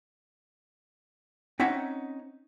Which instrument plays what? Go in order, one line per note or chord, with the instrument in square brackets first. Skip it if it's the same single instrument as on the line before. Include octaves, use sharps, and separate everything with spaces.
[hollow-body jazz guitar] C4 C#4 D#4 E5 F#5